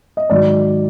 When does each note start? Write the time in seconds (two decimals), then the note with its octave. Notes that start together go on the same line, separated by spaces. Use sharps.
0.17 D#5
0.30 G#2 D#3 F#3 D5